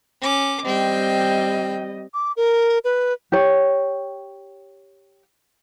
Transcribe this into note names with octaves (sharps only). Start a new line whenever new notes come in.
C#4 D6
G3 C4 D#5 G5
D6
A#4
B4
G4 C#5